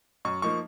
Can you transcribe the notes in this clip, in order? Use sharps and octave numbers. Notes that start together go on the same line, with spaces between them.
F#2 C#6
F3 A#3 D#4 C#6